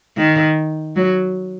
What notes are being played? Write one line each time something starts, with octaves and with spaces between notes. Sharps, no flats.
D#3
F#3